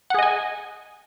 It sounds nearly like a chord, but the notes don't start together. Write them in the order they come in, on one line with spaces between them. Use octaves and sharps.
F#5 G#4 D#5 G#5